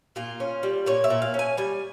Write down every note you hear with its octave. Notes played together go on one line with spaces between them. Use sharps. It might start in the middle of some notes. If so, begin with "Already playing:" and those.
A#2 F4
C#4
G3
A#2 C#5
E5
A#2
F5
C#4
G#5
G3 G#5